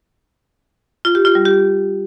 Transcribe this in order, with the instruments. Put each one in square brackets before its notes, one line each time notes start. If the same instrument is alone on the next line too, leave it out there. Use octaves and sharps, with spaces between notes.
[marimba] F4
G4
F4
G3
G4